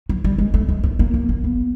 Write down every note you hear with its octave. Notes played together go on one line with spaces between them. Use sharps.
F#3
G3
G#3
A3
G#3
A3
A#3
A#3
A#3
B3